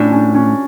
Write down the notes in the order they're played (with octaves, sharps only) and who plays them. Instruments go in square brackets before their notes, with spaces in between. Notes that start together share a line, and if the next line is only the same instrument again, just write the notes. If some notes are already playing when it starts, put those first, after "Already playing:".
Already playing: [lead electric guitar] A2 [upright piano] C#4 D4
[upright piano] C#4
C#4